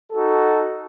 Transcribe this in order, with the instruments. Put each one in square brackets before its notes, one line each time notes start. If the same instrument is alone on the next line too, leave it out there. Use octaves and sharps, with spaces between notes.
[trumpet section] D#4 F#4 A4